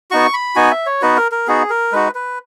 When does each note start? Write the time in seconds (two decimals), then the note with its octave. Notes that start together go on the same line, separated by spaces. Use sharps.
0.11 B3 D#4 F#4 C#6
0.33 B5
0.56 B3 D#4 F#4 G#5
0.71 E5
0.86 C#5
1.02 B3 D#4 F#4 B4
1.17 A#4
1.32 A#4
1.47 B3 D#4 F#4 G#4
1.70 A#4
1.92 G#3 D#4 F#4 B4
2.15 B4